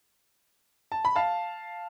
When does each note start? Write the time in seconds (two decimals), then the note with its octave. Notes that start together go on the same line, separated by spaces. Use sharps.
0.92 A5
1.05 B5
1.16 F5 A5